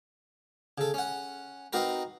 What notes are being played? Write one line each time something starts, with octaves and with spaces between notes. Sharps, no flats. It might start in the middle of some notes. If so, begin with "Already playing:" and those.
C#3 A4
C#4 F#5
C4 D#4 F#4 A#4 B4